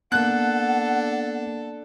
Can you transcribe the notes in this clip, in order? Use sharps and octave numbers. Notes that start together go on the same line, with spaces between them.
A#3 B3 D4 A4 F#5 F#6